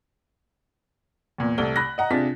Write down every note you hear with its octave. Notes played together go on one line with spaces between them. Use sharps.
E2 A#2
C2 A3 G7
B5 F#6 A#6
D#5 F#5 A#5
C3 D4 F4 G#4 B6